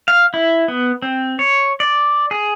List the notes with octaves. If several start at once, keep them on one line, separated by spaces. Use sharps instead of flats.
F5
E4
B3
C4
C#5
D5
G#4